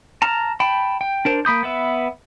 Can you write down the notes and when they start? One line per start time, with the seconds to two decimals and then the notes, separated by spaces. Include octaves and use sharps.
0.22 A5 A#5 F6
0.60 G5 A5 B5
1.01 G5
1.25 D4 A#4 C5
1.45 A#3 B5 D#6 G6
1.63 B3 B4 E5